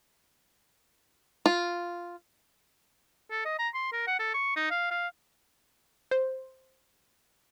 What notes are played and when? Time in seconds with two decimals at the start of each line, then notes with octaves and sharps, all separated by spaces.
1.46 F4
3.31 A4
3.45 D#5
3.59 A#5
3.74 C6
3.93 A#4
4.07 F#5
4.19 A4
4.34 C#6
4.56 D#4
4.71 F5
4.91 F5
6.11 C5